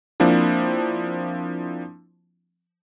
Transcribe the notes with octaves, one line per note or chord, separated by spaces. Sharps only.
F3 A#3 C4 D4 E4